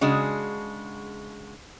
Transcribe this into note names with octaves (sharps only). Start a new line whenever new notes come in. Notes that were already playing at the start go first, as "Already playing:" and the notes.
C#3 G#3 D4 F#4